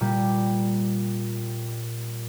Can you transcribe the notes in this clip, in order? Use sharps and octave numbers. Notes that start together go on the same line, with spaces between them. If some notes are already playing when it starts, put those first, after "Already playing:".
A#2 G3